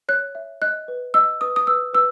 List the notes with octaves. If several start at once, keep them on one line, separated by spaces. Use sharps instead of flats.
C#5 F#6
E5
D#5 F#6
B4
D#5 E6
B4 D#6
D#6
B4 E6
B4 E6